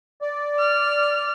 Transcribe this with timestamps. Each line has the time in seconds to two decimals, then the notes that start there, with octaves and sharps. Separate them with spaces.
0.22 D5
0.59 F6